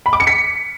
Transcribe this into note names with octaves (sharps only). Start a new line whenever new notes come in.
B5
D6
C#7
B6